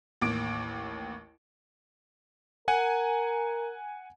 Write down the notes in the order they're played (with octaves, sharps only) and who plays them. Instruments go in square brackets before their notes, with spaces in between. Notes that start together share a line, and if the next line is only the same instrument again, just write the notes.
[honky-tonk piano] A1 D#2 D6 D7
[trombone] A#4 [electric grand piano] F#5 G#5